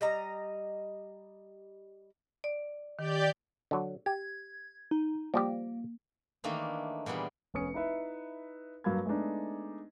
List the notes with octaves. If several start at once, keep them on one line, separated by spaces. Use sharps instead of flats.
G3 D#5 A#5
D5
D#3 G4 D5 G6
D3 F#3
G4 G#6
D#4
F3 G3 A#3 G4
D#3 E3 A3 A#3 D4 D#4
A#2 E3 G3 B3 G#4
F1 B3 C#4 D#6 C#7
D#4 E4 B4 E5
G2 F#3 A#3 F5 B5 G#6
G#3 A3 B3 D4 D#4